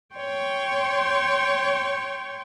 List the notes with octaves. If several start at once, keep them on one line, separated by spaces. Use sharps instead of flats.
C#5 G5 C6 C#6